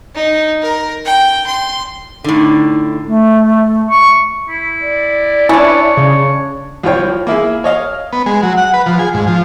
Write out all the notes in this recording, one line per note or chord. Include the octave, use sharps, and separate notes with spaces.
D#4
A#4
G5
C6
A2 D3 D#4
A3
C#6
E4
D5
C#4 D4 E4 C#5
C#3
C2 F3 F4 C#5 G5
F3
A#3 E4 G#4
C#5 D#5 F5
B3
G#3
F#3
F#5
B4
F3
G#4
G#2
F3